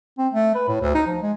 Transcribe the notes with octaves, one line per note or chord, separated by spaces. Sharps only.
C4
A3
B4
A2
D2
D#4
F3
G#3